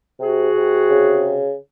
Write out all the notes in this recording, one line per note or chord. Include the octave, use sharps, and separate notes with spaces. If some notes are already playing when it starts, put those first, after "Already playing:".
C3 F#4 G#4
C3
C#3